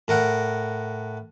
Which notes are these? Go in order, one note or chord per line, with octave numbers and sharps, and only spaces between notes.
A2 A#4 F#5